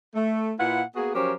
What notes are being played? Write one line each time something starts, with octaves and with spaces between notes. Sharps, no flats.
A3
A#2 E4 F4 B4 F#5
A#3 B3 F#4 G#4
F3 F#3 C#4 G4 A#4 C5